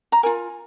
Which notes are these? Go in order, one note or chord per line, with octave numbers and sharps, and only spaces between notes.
A#5
F4 A#4 G#5